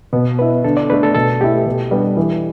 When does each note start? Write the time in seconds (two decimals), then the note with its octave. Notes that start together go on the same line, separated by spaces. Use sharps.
0.13 B2 B3
0.39 B3 E4 B4
0.64 D3 A4
0.77 D5
0.89 A3 D4 B4
1.03 A4
1.15 B2 A4
1.41 A3 E4 G4
1.66 B2
1.91 G3 B3 D4
2.17 E3